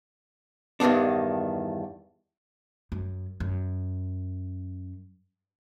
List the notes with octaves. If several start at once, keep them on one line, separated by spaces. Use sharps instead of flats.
E2 G2 D#3 B3 D4
F#2
F#2